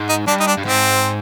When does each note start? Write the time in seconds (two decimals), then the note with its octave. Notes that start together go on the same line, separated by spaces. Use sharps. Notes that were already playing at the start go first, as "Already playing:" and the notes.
Already playing: G#2
0.09 D#4
0.27 G2 D4
0.40 D#4
0.47 D4
0.58 G2
0.65 G#2 C4